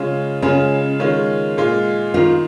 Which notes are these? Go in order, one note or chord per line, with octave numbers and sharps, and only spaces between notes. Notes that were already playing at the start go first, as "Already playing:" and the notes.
Already playing: C#3 G#3 C#4 F4
C#3 G#3 C#4 F4
D#3 G#3 C#4 F4
A#2 G#3 F4
D#3 A#3 D#4 F4